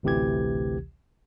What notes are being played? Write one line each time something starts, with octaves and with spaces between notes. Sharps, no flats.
A1 D2 C3 E3 G4 G#6